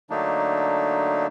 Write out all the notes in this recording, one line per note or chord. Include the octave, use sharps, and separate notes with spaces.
D3 F#3 A3 A#3 D4 D#4